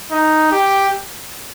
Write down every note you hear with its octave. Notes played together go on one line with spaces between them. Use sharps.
D#4
G4